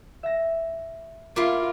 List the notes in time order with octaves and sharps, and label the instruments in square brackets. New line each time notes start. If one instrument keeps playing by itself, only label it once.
[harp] E5 A#6
[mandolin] A#3 E4 C6 [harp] B3 [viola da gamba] F4